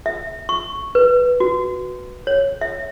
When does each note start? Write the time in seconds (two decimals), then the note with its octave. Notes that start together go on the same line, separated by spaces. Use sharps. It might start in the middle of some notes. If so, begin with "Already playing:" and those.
0.06 E5
0.49 C#6
0.95 B4
1.40 F#4
2.27 C#5
2.61 E5